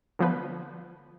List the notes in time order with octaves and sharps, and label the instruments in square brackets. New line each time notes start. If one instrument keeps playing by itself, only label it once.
[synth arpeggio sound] D3 F3 B3 B4